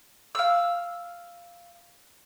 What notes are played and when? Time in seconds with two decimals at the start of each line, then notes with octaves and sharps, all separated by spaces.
0.35 F5 E6